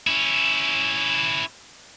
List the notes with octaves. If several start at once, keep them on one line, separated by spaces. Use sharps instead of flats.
C#4 E4